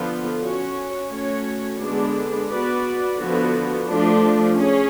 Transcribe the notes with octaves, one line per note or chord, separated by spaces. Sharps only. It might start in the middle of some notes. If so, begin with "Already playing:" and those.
Already playing: D3 F3 B3 F4
C#4 F#4 C#5
A3 C#4 F#4 C#5
D3 G#3 B3 D4
B3 F#4 B4 D5
D3 F3 B3 F#4
F3 A3 D4 F4
C#4 G#4 C#5